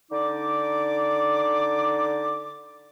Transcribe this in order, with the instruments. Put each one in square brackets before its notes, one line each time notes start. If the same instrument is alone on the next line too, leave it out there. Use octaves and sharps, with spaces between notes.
[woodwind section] D3 D#4 D5 D6